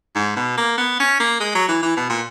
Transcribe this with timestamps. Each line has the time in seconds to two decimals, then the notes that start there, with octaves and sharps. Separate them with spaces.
0.16 G#2
0.36 B2
0.57 A#3
0.78 B3
0.99 C#4
1.20 A#3
1.40 G#3
1.55 F#3
1.68 E3
1.82 E3
1.97 B2
2.09 A#2